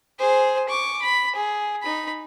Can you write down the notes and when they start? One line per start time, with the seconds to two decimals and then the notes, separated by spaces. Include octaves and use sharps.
0.19 G#4 C5
0.69 C#6 D6
1.02 B5
1.36 G#4
1.83 D#4 B5